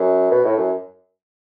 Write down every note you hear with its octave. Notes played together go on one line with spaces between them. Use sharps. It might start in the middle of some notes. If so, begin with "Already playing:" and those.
Already playing: F#2
B2
A2
F#2